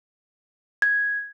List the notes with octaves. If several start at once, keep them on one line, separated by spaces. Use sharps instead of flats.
G#6